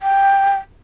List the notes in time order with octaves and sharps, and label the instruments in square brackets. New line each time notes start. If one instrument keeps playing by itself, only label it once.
[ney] G5